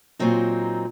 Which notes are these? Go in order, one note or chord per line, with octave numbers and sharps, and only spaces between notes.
A#2 F#3 C4 D#4